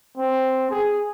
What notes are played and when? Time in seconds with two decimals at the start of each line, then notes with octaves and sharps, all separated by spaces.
0.17 C4
0.71 G#4